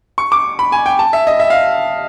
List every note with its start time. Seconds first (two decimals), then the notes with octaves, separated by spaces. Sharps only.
0.18 C#6
0.32 D6
0.59 B5
0.72 G#5
0.86 G5
0.99 A5
1.13 E5
1.27 D#5
1.40 E5
1.50 F5